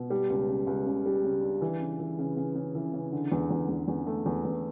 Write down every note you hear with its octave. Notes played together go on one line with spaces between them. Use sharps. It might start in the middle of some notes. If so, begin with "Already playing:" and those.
Already playing: B2
G3
C#2
C#3
C#2
C#3
G3
C#3
D4
E3
C#3
E3
C#3
C#3
C#3
E3
C#3
D3
E2
E2
E2
E2
A3
E2
E2